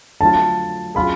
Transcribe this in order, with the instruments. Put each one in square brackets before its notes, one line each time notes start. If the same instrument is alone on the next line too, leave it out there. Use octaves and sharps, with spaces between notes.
[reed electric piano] F2 D3 F#3 A3 F4 [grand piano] A5
[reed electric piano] F#3 C#4 F4 G#4 [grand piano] B5